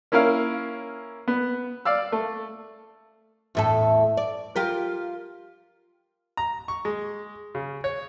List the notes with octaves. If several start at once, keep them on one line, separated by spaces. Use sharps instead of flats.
A#3 C#4 E4 A#4 F5
B3
D5 F5 E6
A3
E2 A2 A4
D5
F4 G4 A#4
A#5
C#6
G#3
C#3
C#5